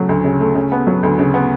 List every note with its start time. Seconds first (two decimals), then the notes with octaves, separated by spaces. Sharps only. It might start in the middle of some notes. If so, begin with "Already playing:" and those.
Already playing: C#3 F#3 A3
0.09 D2
0.24 C#3
0.40 A3
0.55 C#3
0.72 B3
0.87 F#3
1.03 D2
1.19 C#3
1.34 B3